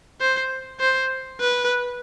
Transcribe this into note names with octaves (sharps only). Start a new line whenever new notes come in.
C5
C5
B4